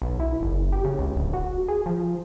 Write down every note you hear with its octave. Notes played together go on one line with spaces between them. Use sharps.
B1
E4
F#1
G4
C#3
C#2
D1
F#4
G#4
F3